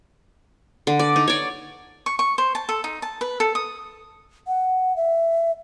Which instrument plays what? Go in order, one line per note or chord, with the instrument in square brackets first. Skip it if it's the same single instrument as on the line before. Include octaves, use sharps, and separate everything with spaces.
[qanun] D3
D5
D#4
C#5 D5
[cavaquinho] C#6
C#6
C5
A5
A4
D#4
A5
B4
A4
D#6
[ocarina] F#5
E5